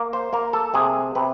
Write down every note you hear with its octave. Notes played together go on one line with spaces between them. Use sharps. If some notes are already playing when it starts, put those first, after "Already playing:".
Already playing: A#3
C5
A#3 A#4
A4
C3 G#4
C3 B4